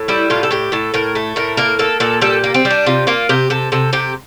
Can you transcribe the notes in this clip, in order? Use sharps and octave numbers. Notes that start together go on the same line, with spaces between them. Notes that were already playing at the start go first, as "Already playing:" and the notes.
Already playing: A2
G3 E4
A2 F4
A4
A2 G4
A2 A4
A2 A#4
A3
A2 A#4
A#3 A#4
A#3 A4
A#2 A4
G3 A4
A#3
C4
G3
D4
C3 F4
A#3 F4
C3 G4
C3 A4
C3 A4
C3 G4